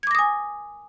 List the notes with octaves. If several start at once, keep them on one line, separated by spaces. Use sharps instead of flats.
G#5 D6 D#6 G#6 A#6